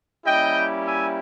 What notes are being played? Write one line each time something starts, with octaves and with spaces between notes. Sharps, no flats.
G3 A#3 C#4 E4 G4 D#5 G5
E5 G#5